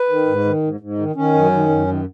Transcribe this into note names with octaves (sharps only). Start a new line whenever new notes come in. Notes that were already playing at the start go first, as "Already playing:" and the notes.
Already playing: B4
D#3
G#2
D#3
G#2
G#2
D#3
D#3 C#4
F#2
D#3
F#2
D#3